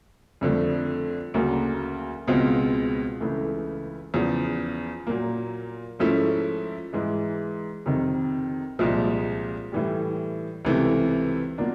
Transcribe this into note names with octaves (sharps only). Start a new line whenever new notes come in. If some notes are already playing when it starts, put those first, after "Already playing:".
F2 D3 F3 A3
D2 C#3 F#3 A#3
C#2 B2 G#3 C4 F4
C#2 C#3 E3 A3
E2 C#3 F3
A#2 F#3 A#3
G#2 F3 A3 C#4 E4
G#2 E3 G#3
F2 C3 D#3
C2 A#2 F3 G#3
A2 E3 G3
C#2 C3 E3 A3
B2 F#3 A#3 D4 F4